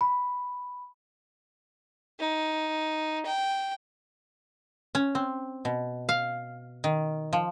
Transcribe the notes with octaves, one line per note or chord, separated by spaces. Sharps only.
B5
D#4
G5
C#4
C4
B2
F5
D#3
F3